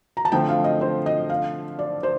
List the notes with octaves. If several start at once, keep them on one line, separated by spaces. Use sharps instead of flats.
A#5
A5
D3 F3 A3 C4 G5
F5
D#5
C5
D#5
F5
D5
C5